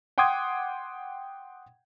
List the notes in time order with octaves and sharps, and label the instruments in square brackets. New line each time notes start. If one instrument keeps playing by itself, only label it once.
[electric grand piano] F#5 G5 C6 D6 D#6 G#6